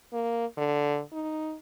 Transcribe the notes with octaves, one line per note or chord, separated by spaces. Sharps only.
A#3
D3
D#4